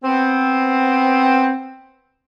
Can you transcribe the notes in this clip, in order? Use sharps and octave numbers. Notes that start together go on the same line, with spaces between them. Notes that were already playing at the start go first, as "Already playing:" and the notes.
B3 C4